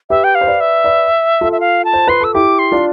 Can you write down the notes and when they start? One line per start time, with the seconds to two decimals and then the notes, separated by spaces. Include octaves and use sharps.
0.10 G4 B4 E5
0.24 G5
0.35 F5
0.41 C5
0.47 B4 D5
0.60 E5
0.84 B4 D5
1.41 F4 A4
1.52 E5
1.60 F5
1.85 A5
1.93 C5
2.08 B4 C6
2.21 A4 E6
2.34 E4 G4 D6
2.59 C6
2.72 D4 F4